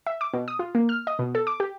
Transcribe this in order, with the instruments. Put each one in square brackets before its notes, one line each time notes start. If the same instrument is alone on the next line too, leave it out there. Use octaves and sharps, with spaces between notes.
[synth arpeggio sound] E5
D6
B2
D#6
F4
A#3
F6
D#5
B2
A4
D6
G4